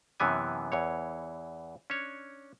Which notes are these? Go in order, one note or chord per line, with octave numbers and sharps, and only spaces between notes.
F#2 C3 E3 B3 G#5
E2 E3 C#5
C#4 D4 C#5